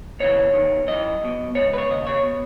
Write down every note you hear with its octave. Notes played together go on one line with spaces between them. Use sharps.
D#2 C#3 E3 C#5
E2 D#3
F#2 E3 D#5
B1 B2
C#2 B2 C#5
B4
C#5
D#2 C#3 D#5
C#5
B2